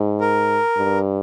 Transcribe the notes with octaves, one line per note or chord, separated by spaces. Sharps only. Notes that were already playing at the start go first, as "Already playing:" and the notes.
Already playing: G#2
A#4
G2